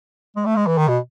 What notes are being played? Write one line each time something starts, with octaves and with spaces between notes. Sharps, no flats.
G#3
A3
G#3
E3
D#3
B2